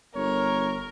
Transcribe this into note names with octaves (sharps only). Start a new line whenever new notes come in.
G1 A#4 C#5